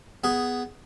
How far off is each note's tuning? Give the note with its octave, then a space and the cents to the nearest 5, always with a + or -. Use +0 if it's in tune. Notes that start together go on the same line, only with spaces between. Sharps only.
B3 +5 G#4 +0